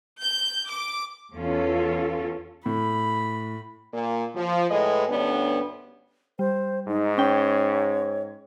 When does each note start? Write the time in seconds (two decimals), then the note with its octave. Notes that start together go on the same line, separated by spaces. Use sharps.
0.21 G6
0.67 D6
1.35 E2 C#4 F4 A4
2.66 A2 B5
3.93 A#2 A#3
4.35 F3
4.70 A2 G#3 B4 D#5
5.08 D2 G2 B3 C#4 D4
6.39 G3 C5
6.88 G#2 D#4
7.18 C#4 C#5 G5